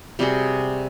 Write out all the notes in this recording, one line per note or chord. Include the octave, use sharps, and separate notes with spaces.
C3 G3 F#4 G#4